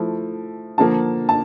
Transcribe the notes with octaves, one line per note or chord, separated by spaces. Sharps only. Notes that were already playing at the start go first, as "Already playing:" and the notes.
Already playing: F3 A3 E4
D3 F3 A#3 A5
A5